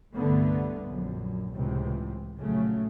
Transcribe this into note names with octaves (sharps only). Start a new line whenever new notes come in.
C2 G2 D3 A3 B3
A#1 F#2
C#2 A2 C3 E3
A#1 C#3 F#3 A3